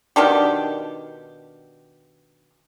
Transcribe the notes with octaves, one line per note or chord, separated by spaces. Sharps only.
B2 D#3 D4 G4